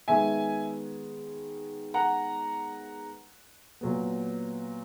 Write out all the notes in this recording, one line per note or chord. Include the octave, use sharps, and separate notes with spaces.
D#3 G#3 B3 E5 G#5
F#5 A#5
A#2 F#3 B3